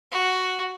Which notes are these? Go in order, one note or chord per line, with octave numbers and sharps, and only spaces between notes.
F#4